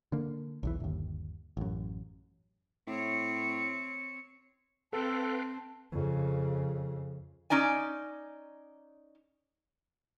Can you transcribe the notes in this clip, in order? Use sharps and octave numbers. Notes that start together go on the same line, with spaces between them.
D3 A#3
B1 E2 E3
G1 D#2
A1 F#2
A2 C4 C#5
C4 A4 B4 F5 G5 A5
F2 C#3
C#4 D#4 D5 G#5